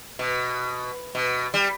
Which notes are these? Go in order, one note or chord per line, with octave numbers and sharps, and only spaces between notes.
B2
B2
G3